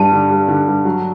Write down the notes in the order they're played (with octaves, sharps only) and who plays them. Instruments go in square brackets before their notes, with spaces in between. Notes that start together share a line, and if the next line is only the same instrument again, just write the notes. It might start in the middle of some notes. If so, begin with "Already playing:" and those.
Already playing: [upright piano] G2 G3 [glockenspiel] A5
[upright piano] D3
G3
D3
G2
F#3